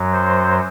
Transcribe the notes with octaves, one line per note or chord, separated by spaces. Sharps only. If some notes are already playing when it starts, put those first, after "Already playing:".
Already playing: F#2 F#3
C5